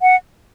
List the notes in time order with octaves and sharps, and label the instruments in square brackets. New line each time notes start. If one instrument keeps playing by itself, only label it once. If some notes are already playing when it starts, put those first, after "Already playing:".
[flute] F#5